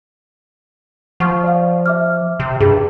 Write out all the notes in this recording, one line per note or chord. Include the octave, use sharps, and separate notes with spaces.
F3 F#5 C#6 F6
D5 F5
E5 D6 F6
C3
G2 G#4